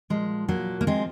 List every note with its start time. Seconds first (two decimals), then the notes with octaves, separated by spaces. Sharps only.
0.10 A#2 F3 G#3
0.49 F#3 A#3
0.81 A#3
0.87 F3 G#3 C4